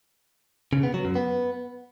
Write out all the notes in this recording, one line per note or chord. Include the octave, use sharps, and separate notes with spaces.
C#3
B3
F#3
F#2
B3